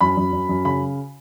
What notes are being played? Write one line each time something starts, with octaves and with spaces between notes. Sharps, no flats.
F#2 B5
F#2
F#2
F#2
C#3 B5